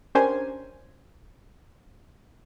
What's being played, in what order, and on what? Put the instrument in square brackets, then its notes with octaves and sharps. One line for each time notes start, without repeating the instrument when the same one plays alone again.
[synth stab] C#4 D4 G4 A#4 C5 G#5